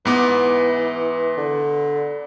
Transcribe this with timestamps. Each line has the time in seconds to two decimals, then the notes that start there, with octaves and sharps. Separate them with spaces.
0.05 G#2 E3 B3 D6
1.37 D3